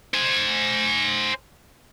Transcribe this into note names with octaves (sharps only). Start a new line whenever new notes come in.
C5 G#5